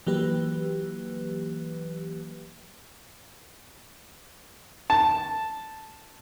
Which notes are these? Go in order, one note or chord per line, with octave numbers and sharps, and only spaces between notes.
E3 F#3 A#3 G4 B4
A5